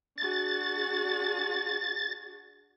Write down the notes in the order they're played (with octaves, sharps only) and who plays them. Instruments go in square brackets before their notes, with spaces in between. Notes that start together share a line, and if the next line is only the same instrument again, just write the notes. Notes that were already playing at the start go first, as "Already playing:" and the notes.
[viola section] D4 F#4 G#4 [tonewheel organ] A6